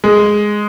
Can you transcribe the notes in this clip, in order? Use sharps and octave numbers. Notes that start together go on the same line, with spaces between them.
G#3